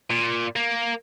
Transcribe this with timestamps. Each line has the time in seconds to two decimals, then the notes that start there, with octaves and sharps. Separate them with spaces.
0.10 A#2
0.56 A#3